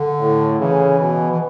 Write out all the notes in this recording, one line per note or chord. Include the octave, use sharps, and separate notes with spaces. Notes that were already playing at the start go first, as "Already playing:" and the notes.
Already playing: D3
A2
C#3 E3
B2
E3